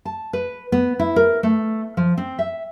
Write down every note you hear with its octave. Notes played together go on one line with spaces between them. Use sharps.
A5
B4
B3
E4
A#4
A3
F3
C4
E5